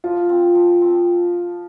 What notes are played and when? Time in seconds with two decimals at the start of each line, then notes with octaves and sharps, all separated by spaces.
0.04 F3 F4
0.29 C4
0.55 F3
0.82 C4